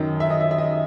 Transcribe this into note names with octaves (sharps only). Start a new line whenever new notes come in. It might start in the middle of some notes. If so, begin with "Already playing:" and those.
Already playing: F#2 D#3
E5
D#5
E5
E5
D#5